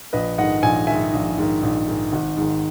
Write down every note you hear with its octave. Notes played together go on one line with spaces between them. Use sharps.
A#1 B4 D#5
G#2 D#3 D#5 F#5
A#1 G#5
G#2 D#3 E5 G#5
A#1
G#2 D#3
A#1
G#2 D#3
G#1
G#2 D#3